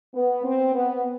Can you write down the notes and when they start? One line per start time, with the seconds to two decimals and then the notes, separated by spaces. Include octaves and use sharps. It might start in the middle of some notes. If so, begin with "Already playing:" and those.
0.14 B3
0.44 C4
0.74 B3